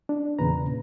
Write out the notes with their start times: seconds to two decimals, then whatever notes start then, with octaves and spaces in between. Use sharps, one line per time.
0.09 D4
0.39 E2 A#2 C#3 B4 A#5